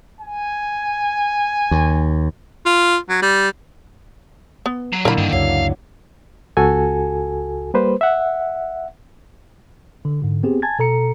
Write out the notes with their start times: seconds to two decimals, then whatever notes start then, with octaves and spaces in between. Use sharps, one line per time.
0.21 G#5
1.71 D#2
2.65 F4
3.09 F#3
3.22 G3
4.66 B3
4.93 F#3
5.05 A#2 D3 A#3 E4 A#4 B5
5.17 G2 D#3
5.32 C#2 F#2 F#3 F5
6.57 C#2 F#4 A4 G#5
7.74 G3 A#3 B4 C5
8.01 E5 F#5
10.05 D3
10.22 G#2 D3
10.43 B3 C4 G4 G#4
10.62 G#5 A5 G#6 A6
10.79 B2 A4 A#5 C#7